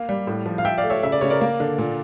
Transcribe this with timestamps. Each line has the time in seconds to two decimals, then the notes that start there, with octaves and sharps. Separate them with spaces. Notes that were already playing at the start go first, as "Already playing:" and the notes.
Already playing: A#3 F5
0.09 G3
0.27 A2
0.46 F3
0.58 F5
0.65 F3 E5 G5
0.78 D5 F5
0.84 A3
0.90 C#5 E5
1.03 C#3 E5
1.12 D5
1.21 C#3 C#5
1.30 A#4 D5
1.41 A#3
1.60 D3
1.78 A#2